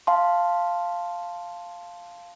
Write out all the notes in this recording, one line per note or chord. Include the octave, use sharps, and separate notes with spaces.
F5 A5 C6